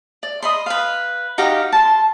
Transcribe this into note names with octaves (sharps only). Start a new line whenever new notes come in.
D5
D#5 B5 C6
B4 F5
D#4 F#4 G4 F5
A5 C6